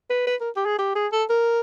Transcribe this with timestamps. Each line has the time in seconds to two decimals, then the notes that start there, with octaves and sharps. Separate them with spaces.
0.10 B4
0.26 B4
0.40 A#4
0.56 G4
0.65 G#4
0.78 G4
0.95 G#4
1.12 A4
1.29 A#4